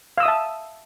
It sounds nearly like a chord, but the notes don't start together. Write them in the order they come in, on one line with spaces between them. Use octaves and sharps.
F5 E6 D#6 E5 A5